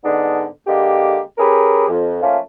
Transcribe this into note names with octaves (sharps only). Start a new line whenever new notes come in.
G#2 D3 B3 D4 D#4
D3 G#3 A#3 G4
C#4 G4 G#4 A#4 B4
F2
F3 A3 A#3 C#4 F4